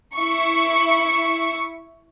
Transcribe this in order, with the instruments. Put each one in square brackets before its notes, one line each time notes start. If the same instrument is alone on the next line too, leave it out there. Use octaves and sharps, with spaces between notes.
[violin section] E4 C#6